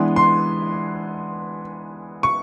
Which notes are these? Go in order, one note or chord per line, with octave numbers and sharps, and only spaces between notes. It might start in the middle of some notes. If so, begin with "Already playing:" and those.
Already playing: E3 G#3 B3 D4 C6
C6
C#6